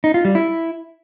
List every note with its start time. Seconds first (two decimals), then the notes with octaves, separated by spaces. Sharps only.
0.04 D#4
0.14 F4
0.25 G3
0.35 E4